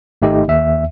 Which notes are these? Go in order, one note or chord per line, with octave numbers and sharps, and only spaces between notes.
G#1 A3 D#4 G4 D#5
D#2 E5